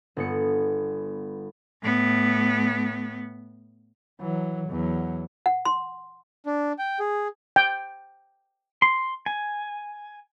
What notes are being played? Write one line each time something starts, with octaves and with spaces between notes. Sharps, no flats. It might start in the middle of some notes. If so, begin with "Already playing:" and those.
G1 B3 C#7
A2 B3
E3 F#3
E2 F#3
F#5
C6
D4
G5
G#4
G5
C6
G#5